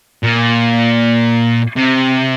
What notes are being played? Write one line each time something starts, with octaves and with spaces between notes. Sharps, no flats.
A#2
C3